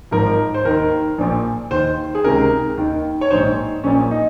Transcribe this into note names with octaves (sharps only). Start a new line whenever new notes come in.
G#1 G#2 F3 A#4
C5
D#2 D#3 A#4
A#1 A#2 F3
D#2 D#3 C5
G#4
C#2 C3 D#3 A#4
D#2 D#3
C#5
A#1 G#2 D#3 C5
A#1 A#2 F3 C#4
D#4